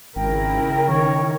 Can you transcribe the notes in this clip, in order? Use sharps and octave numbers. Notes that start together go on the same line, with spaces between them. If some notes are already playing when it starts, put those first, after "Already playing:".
G#1 C#3 E4 A#4 G5
D#3 C#5